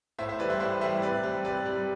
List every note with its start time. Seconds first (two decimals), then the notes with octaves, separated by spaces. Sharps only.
0.19 A2 C5 E5
0.29 C5 E5
0.39 E3 G3 B4 D5
0.50 C5 E5
0.60 A2 C5 E5
0.81 E3 G3 C5 E5
1.02 C3 B4 D5
1.23 G3 C5
1.45 C3 B4 D5
1.65 G3